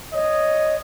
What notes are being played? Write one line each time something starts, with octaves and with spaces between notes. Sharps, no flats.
C#5 D#5